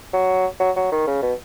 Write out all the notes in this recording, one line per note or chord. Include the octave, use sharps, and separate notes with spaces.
F#3
F#3
F#3
D#3
C#3
B2